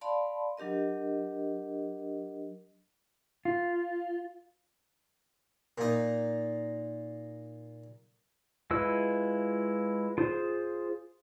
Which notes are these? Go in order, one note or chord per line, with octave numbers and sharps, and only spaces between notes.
D5 F5 A5 B5 C6
F#3 D4 G4 A#4 D#5
F4
A#2 D#4
G#3 E4 F4 B4 E6
F4 G#4 C5